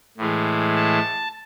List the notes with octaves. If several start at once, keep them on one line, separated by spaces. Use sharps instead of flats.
A2 E3 G#3
A5